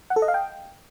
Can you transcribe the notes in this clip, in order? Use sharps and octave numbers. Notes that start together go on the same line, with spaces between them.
F#5
A4
D#5
F5
G5